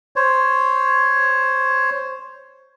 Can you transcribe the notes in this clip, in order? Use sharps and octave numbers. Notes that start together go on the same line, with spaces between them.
C5 C#5